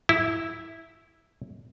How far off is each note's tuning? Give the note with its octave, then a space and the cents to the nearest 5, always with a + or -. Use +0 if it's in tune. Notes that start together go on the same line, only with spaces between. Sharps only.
E4 -5